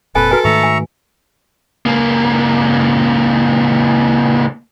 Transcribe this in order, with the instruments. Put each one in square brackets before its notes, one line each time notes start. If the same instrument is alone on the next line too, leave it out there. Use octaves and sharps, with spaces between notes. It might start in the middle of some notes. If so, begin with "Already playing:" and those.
[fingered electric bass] F1 A#2 C4 [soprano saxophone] A4 [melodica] B4 [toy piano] G#5
[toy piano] F#4 B4 G#5 [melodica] A#4
[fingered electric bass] G#2 D#3 A3 [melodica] E5 A#5 C#6
[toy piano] G#5
[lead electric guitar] C#2 A#3